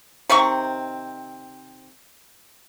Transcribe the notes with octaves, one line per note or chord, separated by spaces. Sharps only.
C3 D#3 C4 C#6